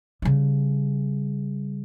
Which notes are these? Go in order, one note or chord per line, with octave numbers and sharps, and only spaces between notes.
C#3 G3